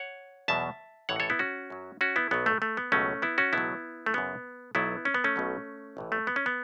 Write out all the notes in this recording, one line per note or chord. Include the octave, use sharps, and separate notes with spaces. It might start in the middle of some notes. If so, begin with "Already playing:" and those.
Already playing: C#5 F#5
E2 B2 F#3 E5 A5
A1 A2 E3 C#5 F#5
A4 C#5
B3 E4
C#4 F#4
F#2 F#3
C#4 F#4
B3 E4
B1 B2 F#3 B3
A3
A3
B3
C#2 B2 F#3 A3 C#4
B3 E4
C#4 F#4
C#2 B2 F#3 B3 E4
A3
F#2 C#3 F#3 B3
B1 B2 F#3 B3 E4
C#4
B3
A3 C#4
B1 B2 F#3
A1 A2 E3
A3
B3
C#4
B3